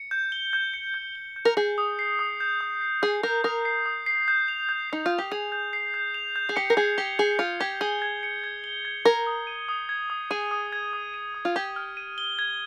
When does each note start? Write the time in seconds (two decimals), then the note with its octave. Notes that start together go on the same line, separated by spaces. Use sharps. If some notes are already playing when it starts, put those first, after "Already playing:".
Already playing: C#7
0.11 G6
0.32 G7
0.53 G6
0.74 C#7
0.94 G6
1.15 G7
1.36 G6
1.45 A#4
1.57 G#4 G6
1.78 D#6
1.99 C7
2.19 D#6
2.40 G6
2.61 D#6
2.81 C7
3.02 G#4 D#6
3.23 A#4 G6
3.44 A#4 D#6
3.65 C7
3.86 D#6
4.06 C7
4.28 G6
4.48 F7
4.69 G6
4.90 D#4 C7
5.06 F4 G6
5.18 G4
5.31 G#4 F7
5.52 G6
5.73 C7
5.94 G6
6.14 F7
6.36 G6
6.49 G#4
6.56 G4 C#7
6.70 A#4
6.77 G#4 G#6
6.98 G4 G7
7.19 G#4 G#6
7.39 F4 C#7
7.60 G4 G#6
7.81 G#4 G7
8.02 G#6
8.23 C#7
8.44 G#6
8.64 G7
8.85 G#6
9.05 A#4 G#6
9.27 D#6
9.47 D#7
9.69 D#6
9.89 G#6
10.10 D#6
10.31 G#4 D#7
10.51 D#6
10.73 G#6
10.93 D#6
11.14 D#7
11.34 D#6
11.45 F4
11.56 G4 G#6
11.76 F6
11.97 D#7
12.18 G7
12.39 G#6